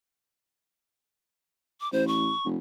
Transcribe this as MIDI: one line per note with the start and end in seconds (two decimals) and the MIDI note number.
1.81 1.91 86
1.92 2.31 33
1.92 2.06 72
2.08 2.47 85
2.45 2.58 29